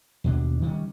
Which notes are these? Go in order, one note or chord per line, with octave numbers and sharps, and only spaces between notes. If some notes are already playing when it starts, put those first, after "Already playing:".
D#2 B2 D4
D#3 G3 C#4